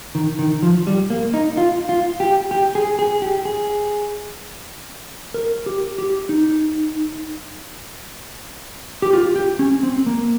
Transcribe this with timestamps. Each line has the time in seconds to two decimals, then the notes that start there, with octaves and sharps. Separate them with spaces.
0.15 D#3
0.39 D#3
0.63 F3
0.87 G3
1.10 A#3
1.34 D#4
1.57 F4
1.89 F4
2.20 G4
2.51 G4
2.75 G#4
2.99 G#4
3.22 G4
3.45 G#4
5.34 A#4
5.66 G4
5.98 G4
6.29 D#4
9.02 G4
9.13 F4
9.36 G4
9.59 C#4
9.83 C4
10.06 A#3